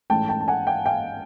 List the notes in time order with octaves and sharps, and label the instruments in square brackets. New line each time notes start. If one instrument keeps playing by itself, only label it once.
[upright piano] A1 G#2 E3 A3 C#4 G5 A5
G5 A5
A5
F#5 G#5
F5 G5
F5 G5